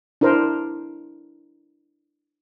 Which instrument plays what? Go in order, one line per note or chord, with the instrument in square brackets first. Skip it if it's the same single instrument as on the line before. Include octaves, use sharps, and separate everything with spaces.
[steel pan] D4 E4 A#4 C5